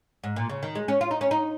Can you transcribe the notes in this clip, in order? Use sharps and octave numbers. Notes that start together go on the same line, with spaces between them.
G#2
A#2
C#3
D#3
G#3
C#4
F4
D#4
C#4
D#4